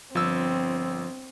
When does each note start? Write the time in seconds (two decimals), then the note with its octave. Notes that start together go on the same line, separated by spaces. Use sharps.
0.15 G1 F3 C4 E6